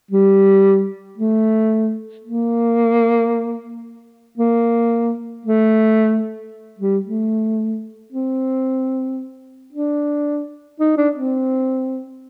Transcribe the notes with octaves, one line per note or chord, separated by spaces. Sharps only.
G3
A3
A#3
A#3
A3
G3
A3
C4
D4
D#4
D4
C4